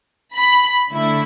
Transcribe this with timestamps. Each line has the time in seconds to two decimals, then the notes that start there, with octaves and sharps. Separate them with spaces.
0.35 B5
0.92 D3 A3 E4